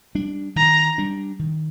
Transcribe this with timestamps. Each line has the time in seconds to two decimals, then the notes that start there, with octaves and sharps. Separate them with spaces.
0.15 G3 D4
0.56 D#3 A#5
0.98 G3 D4
1.39 D#3